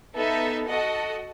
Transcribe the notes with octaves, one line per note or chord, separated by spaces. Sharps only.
B3 D#4 A4 E5
F#4 A4 D#5 F#5 A5